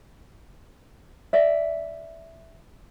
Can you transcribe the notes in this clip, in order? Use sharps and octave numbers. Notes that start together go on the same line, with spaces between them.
D5 E5